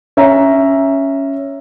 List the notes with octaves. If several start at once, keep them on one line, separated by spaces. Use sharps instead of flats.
C#4 E5 A#5